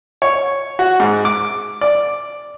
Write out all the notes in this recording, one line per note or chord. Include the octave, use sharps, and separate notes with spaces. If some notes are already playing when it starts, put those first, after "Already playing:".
C#5
F#4
G#2
D6
D5